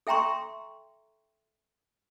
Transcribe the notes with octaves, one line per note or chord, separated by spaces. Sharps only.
A4 E5 G5 A#5 C6 C#6